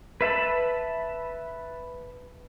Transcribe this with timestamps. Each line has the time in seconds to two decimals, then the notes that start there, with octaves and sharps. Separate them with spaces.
0.21 B4 E5 A5 B5